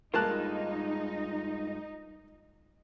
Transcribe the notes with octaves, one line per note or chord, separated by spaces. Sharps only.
G2 G#3 A#3 D#4 F4 A5 F#6